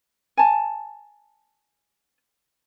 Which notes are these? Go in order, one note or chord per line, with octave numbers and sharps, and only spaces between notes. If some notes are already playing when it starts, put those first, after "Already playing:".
G#5 A5